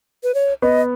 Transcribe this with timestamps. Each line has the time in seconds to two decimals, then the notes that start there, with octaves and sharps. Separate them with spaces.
0.23 B4
0.35 C#5
0.62 B3 D#5